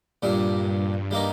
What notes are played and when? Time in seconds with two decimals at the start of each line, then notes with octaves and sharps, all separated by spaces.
0.23 G2 A#2 G3 D4
1.11 G3 A#3 D#4